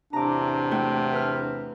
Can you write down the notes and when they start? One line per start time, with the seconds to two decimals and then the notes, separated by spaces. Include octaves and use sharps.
0.13 E2 A2 C3 D4 A#5 D6
0.71 A3 F#4 G5
1.13 B4 F6